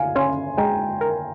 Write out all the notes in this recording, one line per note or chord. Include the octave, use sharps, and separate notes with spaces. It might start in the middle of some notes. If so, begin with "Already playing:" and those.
Already playing: F5 G#5
C#4 G#5 C6
G#3 G5 A#5
A#4